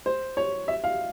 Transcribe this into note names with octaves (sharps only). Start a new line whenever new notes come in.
C5
C#5
E5
F5